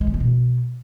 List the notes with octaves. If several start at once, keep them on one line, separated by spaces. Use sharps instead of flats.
G#3
C#3
A#3
B2